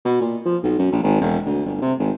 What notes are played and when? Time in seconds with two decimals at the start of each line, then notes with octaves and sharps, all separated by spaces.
0.05 B2
0.21 A#2
0.45 F3
0.63 B1
0.78 F#2
0.92 A#1
1.03 G#1
1.21 E1
1.46 D2
1.66 G1
1.82 C3
1.99 G#1